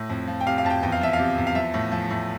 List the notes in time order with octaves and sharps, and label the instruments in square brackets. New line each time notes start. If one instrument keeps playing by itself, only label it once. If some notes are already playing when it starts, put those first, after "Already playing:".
Already playing: [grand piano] A2
F2
F3
G5
C3 F5
F5
F2 A5
G5
E2 G5
F5
F3 E5
F5
C3
E2
F5
F3 E5
A2
F3
A2